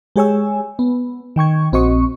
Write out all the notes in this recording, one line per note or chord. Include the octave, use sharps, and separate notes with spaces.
G#3 G4 G#4 C#5 G#5 E6
B3
D#3 G5 C#6 G#6
A#1 C4 F#4 D#5 C#6